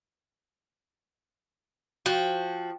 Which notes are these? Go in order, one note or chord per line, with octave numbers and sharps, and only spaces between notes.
F3 F#4 G5